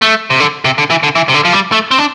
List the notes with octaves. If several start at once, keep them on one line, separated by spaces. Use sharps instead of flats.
A3
C3
D3
C3
D3
E3
D3
E3
C3
D3
F3
G3
A3
C4
D4